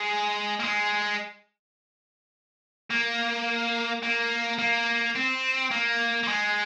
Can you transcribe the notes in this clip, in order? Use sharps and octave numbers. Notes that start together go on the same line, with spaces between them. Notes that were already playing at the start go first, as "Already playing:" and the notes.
Already playing: G#3
A#3
G#3
A#3
A#3
A#3
C4
A#3
A#3
G#3